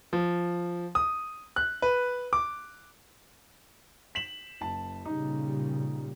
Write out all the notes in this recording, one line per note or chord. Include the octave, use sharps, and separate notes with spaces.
F3
D#6
F#6
B4
D6
B6 E7 F#7
F#1 A5
A#2 C#3 G3 D#4